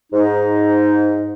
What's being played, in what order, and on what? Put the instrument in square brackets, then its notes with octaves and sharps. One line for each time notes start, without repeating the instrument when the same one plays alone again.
[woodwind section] G#2 D#4